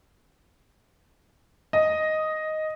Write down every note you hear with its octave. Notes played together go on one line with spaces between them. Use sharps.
D#5